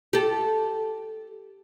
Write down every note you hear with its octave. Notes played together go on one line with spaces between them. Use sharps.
G4 A4